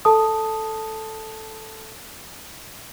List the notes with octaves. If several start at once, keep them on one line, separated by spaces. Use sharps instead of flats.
A4 A5 D#6